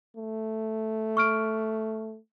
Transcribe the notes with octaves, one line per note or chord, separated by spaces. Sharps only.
A3
C#6 F6 D7